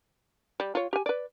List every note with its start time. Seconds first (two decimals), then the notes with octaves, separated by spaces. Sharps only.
0.60 G3
0.75 F4 C#5
0.93 G4 G#5
1.06 B4 D5